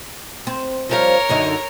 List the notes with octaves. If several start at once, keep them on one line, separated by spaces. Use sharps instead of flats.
C4
F3 G3 A#4 C#5 F5
F#2 D3 D#4